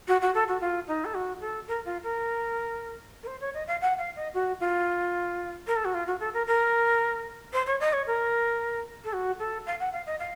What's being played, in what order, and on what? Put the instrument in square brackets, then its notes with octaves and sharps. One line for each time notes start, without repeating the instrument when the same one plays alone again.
[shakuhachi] F#4
F#4
A4
F#4
F4
D#4
A4
F#4
A4
A#4
F4
A#4
A#4
C5
C#5
D#5
F5
F#5
F5
D#5
F#4
F4
A#4
A4
F#4
F4
F#4
A4
A#4
A#4
C5
C#5
D#5
C#5
A#4
A4
F#4
A4
F5
F#5
F5
D#5
F5